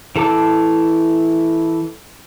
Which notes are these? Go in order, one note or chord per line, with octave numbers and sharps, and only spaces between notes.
E3 A4 A5 D6 E6